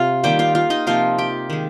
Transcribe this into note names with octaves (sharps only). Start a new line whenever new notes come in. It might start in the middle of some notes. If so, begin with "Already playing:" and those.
Already playing: C3 F4 F5
D#3 G3 A#3 G4 G5
F4 F5
F4 F5
D#4 D#5
C3 F3 A#3 F4 F5
G4 G5
D#3 G#3